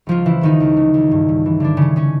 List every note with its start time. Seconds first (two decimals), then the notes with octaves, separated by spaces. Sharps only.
0.07 C#2 F3 F4
0.26 C#3 E3 E4
0.41 C#2 D#3 D#4
0.60 C#2
0.77 C#3
0.94 C#2
1.11 G2
1.29 G2
1.46 E3
1.60 D3 E3 D4
1.77 C#3 E3 C#4
1.96 C#3 C#4